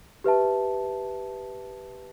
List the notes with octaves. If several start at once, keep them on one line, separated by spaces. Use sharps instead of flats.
G4 B4 E5 A5